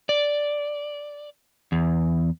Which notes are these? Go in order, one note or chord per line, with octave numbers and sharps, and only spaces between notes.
D5
E2